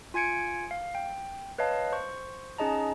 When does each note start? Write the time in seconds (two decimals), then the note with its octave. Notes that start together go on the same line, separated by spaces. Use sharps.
0.14 F4 G#5 G#6 C#7 D7
0.71 F5
0.95 G5
1.58 B4 C#5 D#5 F5 A5
1.92 C5 C#6
2.58 C#4 D#4 G#4 D#5 A5 A#5